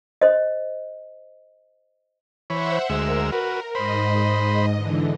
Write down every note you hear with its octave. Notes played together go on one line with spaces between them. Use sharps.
C5 D#5
E3 C5 C#5 E5 F#5 B5
D2 G#3 A#4 E6
F#4 B4
G#2 C5 D#5 B5
D3 E3